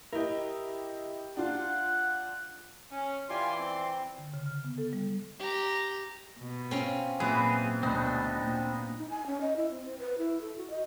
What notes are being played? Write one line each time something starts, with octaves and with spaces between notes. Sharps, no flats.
E4 G4 A#4 D#5
D4 F4 F#5
C#4
E3 F4 G4 D5 G#5 C6
C4
D3
C#3
F6
B3
A4
G3
G4 A#5
B2
C4 C#4 F4
A#2 E3 F#3 B3 C4 G#4 B4
D2 B2 B3 C4 D4 D#4
A#2
D#4
G#5
C#4
D#5
E4
C4
C5
B4
E4
A4
F#4
D#5